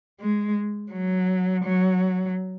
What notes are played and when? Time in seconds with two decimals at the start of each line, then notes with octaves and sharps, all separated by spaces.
0.21 G#3
0.92 F#3
1.64 F#3